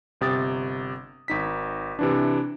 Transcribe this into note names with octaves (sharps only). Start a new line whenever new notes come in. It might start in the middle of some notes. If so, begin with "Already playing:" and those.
G1 C3 D#6 A6
G#1 D#4 B6
C3 E3 D4